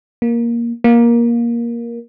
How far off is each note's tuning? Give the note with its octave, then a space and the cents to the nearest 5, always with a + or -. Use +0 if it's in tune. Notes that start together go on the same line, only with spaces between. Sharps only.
A#3 +10
A#3 +15